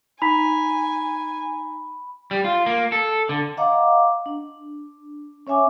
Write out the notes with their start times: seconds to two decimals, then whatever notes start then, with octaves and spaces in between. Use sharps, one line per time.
0.22 D#4 G#5 A#5 B5 B6
2.31 G3
2.45 F4
2.66 A#3
2.92 A4
3.29 D3
3.57 D#5 F5 F#5 A#5 D6
4.26 D4
5.47 C#4 C#5 E5 G#5 D6